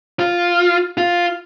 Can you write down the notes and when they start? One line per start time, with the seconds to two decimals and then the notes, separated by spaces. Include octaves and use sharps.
0.19 F4
0.97 F4